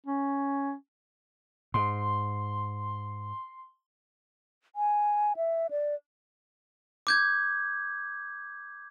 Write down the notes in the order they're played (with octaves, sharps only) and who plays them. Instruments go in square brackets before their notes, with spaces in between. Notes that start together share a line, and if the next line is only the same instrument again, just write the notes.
[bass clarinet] C#4
[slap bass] G#2 [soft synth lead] C6
[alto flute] G#5
E5
D5
[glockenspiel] D6 G6 G#6